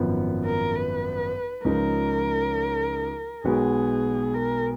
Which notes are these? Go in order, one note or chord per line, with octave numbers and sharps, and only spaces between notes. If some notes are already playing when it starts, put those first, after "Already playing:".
Already playing: G#1 F#2 F3 B3
A#4
B4
C#2 C#3 F3 G#3 D#4 A#4
B1 B2 G#3 B3 F#4 G#4
A#4